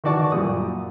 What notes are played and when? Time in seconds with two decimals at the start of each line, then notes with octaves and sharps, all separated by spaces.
0.04 D#3 E3 F#4 D5 A5 C#6
0.32 F#2 A#2 G3 D#6